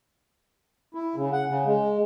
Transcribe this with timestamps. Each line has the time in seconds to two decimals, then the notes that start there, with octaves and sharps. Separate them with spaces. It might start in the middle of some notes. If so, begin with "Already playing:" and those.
0.94 E4
1.16 C#3
1.32 F#5
1.48 C#3
1.66 G#3